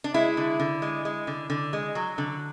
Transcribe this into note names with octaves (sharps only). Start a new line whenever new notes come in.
D4
G#3 E4
D3
D3
G#3
G#3
D3
D3
G#3
F#3
D3